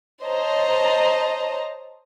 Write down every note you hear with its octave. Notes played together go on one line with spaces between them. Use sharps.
C5 C#5 D#5 A5 A#5